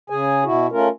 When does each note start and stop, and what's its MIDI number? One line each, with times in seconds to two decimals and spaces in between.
0.10 0.44 49
0.10 0.44 68
0.10 0.44 80
0.44 0.67 47
0.44 0.67 64
0.44 0.67 66
0.72 0.88 57
0.72 0.88 61
0.72 0.88 65
0.72 0.88 70